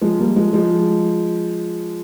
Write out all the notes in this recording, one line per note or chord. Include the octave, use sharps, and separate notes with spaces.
F3 G#3
G3 A#3
F3 G#3
F3 G#3